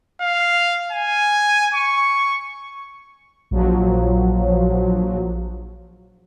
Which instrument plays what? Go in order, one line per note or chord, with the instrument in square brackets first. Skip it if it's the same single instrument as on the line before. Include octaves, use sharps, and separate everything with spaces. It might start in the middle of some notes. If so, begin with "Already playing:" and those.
[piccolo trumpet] F5
G#5
C#6
[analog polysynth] A#1 F3 F#3